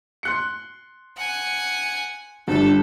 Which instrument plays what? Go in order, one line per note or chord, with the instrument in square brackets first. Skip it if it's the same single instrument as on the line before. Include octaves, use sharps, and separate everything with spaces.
[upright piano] C6 F#6 C#7
[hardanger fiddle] F#5 G#5
[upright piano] G1 G3 [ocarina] D4 [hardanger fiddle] A4